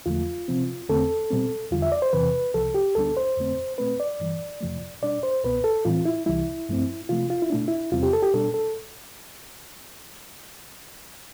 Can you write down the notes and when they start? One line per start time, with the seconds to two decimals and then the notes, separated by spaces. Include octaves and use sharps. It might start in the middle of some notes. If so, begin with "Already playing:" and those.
0.06 E2 D3 F3 A3 F4
0.48 C3 F3 C4
0.89 E2 D3 A3 C4 A4
1.30 B2 G3 C4
1.71 E2 D3 G3 F4
1.82 E5
1.92 D5
2.02 C5
2.13 E2 C3 E3 B4
2.54 C2 C3 F3 A4
2.75 G4
2.95 D2 D3 G3 B3 D4 A4
3.17 C5
3.37 F2 D3 A3 C4
3.78 B2 A3 C4 B4
4.00 D5
4.20 G2 E3 G3
4.61 F2 C3 F3 A3
5.02 B2 G3 D4 D5
5.23 C5
5.44 C2 B2 B3 B4
5.64 A4
5.85 A2 E3 G3 C4 F4
6.06 E4
6.26 C2 C3 E3 G3 E4
6.69 G2 F3 A3 C4
7.09 C3 F3 A3 F4
7.30 F4
7.42 E4
7.50 B2 A3 D4
7.68 E4
7.92 E2 C3 G3 C4 F4
8.03 G4
8.13 A4
8.23 G4
8.33 B2 G3 D4 A4
8.54 A4